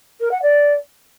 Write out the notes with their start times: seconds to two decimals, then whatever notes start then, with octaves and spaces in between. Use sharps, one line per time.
0.21 A#4
0.31 F#5
0.42 D5